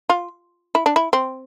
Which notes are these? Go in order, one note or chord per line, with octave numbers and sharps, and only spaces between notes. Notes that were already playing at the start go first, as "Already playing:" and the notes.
F4
E4
D4
E4
C4